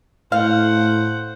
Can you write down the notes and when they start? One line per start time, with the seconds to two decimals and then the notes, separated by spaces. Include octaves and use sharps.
0.32 A2 C5 F5 F#5